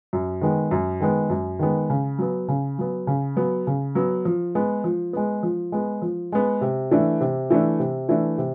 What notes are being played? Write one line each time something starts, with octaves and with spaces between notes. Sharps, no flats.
F#2
D#3 G#3 B3
F#2
D#3 G#3 B3
F#2
D#3 G#3 B3
C#3
F#3 B3
C#3
F#3 B3
C#3
F#3 B3
C#3
F#3 B3
F3
G#3 B3
F3
G#3 B3
F3
G#3 B3
F3
G#3 B3
C3
E3 A3 D4
C3
E3 A3 D4
C3
E3 A3 D4
C3